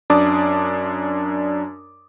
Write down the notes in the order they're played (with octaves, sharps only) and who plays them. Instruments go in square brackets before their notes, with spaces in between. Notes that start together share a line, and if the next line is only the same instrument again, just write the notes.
[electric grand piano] F#2 D4 D5 A5 D6 D#6